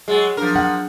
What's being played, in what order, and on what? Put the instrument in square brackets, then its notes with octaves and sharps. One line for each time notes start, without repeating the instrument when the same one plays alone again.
[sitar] F#3 G#3 [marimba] G#4 A6
[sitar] F3 A#4 [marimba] F#3 D4
[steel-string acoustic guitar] F#5